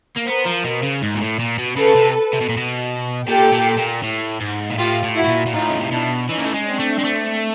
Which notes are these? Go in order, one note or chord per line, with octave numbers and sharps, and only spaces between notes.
A#3
B3 A#4 C5
F3
B2
C#3
G#2
A#2
A2
A#2
B2
C#3 A4 B4
C3
C3
B2
A#2
B2
A#2 G4 A4
A#2
A#2
A2
G#2
A#2
A2 F4 G4
A2
E4 F#4
A2
A#2
A#2
A2 D#4 F4
C#3
C3
B2 D4 E4
E3 C#4 D#4
A#3
A3
G#3
C4 D4
A3
G#3
A3